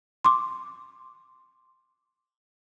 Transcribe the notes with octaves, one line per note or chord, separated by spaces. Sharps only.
C6 D6